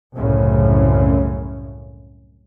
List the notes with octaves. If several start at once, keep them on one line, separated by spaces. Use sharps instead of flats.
C2 F#2 A2 C#3